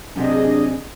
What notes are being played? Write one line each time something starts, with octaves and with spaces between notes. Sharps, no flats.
F#2 C3 D4 G#4 D#5